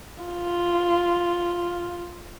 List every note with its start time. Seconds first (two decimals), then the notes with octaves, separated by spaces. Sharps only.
0.24 F4